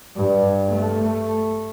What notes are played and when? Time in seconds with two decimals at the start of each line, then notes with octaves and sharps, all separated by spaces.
0.16 G2
0.69 A3